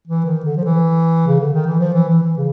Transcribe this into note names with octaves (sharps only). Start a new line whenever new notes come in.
E3
D#3
D3
F3
E3
C#3
D3
D#3
E3
F3
E3
E3
E3
C#3